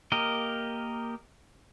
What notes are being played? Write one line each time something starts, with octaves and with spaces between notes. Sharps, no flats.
A#3 G4 A#4 D#5